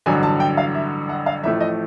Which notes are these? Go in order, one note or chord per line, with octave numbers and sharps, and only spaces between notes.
A1 G2 D3 F#3 G#5
A5
G5
F5
E5
F#5
F5
A1 A2 F3 A3 E5
D#5